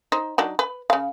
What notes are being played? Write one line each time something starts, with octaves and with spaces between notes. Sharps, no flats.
D#4 C5
F#3 D4 D#4
B4
C#3 F5